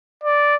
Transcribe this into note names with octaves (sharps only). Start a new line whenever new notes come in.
D5